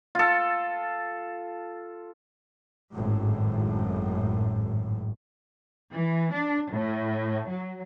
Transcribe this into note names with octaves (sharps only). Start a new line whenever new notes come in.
F4 A4
G#1 F#2 A2
E3
D4
A2
F#3